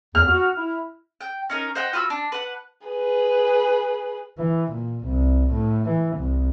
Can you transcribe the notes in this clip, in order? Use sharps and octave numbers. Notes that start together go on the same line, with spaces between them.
E2 F6
F#4
E4
G5
C#4 D#4 A#4
C5 D#5 F#5 G5
F4 F#4 B5 E6
D4
B4 F#5
G#4 B4
E3
A#2
C2
A2
E3
C2